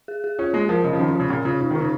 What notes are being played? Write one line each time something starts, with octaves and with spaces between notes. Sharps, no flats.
G#4
G#4
C#4 F4
G#3 A#3
F3 A#4
C#3 D#5
F3
D#3 C#4
F3
C#3 F4
A#2 C#4
C#3 F4
C#3 D#4
D#3
D#4
C#3